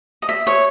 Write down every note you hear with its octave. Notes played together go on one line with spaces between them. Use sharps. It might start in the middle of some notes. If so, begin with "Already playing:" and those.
D#5
E5
C#5